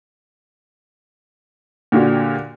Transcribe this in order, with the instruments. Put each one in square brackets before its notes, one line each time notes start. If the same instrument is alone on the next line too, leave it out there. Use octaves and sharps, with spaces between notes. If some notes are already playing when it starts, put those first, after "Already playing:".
[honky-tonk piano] A#2 D3 F#4 G4